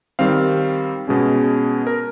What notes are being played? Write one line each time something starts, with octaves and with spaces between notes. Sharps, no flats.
D#3 G3 C4 F5
B2 G#3 C#4
A#4